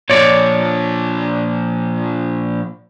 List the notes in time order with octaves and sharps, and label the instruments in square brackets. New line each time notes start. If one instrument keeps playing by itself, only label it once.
[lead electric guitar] A#2 F3 [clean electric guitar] C#5 D5